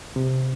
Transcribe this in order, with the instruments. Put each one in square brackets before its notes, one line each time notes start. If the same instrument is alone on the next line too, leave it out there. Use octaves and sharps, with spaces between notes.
[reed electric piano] C3